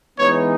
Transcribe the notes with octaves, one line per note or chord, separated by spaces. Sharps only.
E3 G#3 B3 D#4 C#5